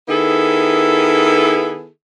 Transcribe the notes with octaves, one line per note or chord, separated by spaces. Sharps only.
D#3 B3 E4 G#4 A4